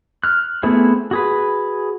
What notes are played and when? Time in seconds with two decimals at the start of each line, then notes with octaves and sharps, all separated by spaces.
0.24 F6 F#6
0.63 A3 B3 C4 E4 G#4
1.11 F#4 G#4 B4